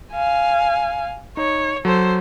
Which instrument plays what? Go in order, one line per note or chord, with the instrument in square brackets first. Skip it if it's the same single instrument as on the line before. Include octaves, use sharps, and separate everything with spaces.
[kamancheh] F5 G#5
[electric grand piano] D#4 [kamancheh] C#5
[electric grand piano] F#3 [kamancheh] A4 C5